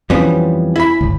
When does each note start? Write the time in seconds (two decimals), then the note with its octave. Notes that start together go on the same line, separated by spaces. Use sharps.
0.10 F2 E3 F3 G3 B3 C#4
0.76 E4 B5
1.01 G1 C#2